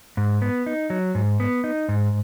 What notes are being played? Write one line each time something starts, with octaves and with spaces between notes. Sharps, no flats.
G#2
B3
D#4
F#3
G#2
B3
D#4
G#2